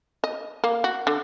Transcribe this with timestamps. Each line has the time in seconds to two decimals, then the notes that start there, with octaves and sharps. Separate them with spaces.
0.24 D#5
0.64 A#3
0.84 F#4
1.07 D3